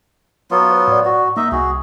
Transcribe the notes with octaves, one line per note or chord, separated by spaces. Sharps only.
F#3 B3 F4
C5
A2 D5
F#4
A#3 D#4 D#5 E5
C2 F#4 G#4